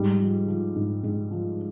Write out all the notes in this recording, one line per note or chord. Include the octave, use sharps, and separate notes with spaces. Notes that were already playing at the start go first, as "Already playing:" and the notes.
Already playing: G#2 G3
F3
F3
G#2
G#2
F3